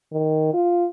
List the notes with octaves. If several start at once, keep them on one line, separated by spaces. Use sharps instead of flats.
D#3
F4